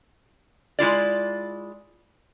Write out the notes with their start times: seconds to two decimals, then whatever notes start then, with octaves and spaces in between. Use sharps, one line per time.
0.79 G#3 E4 F4 D5